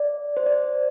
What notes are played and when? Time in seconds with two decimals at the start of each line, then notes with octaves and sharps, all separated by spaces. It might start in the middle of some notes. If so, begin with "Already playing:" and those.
Already playing: D5
0.37 C5
0.46 D5